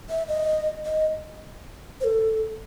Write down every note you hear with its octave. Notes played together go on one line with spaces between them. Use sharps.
E5
D#5
D#5
C5
A4